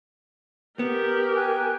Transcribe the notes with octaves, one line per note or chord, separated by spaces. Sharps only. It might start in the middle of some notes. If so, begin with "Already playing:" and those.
B3 G4 A#4
G5 G#5 F#6